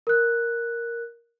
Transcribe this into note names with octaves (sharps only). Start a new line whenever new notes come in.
A#4 F#6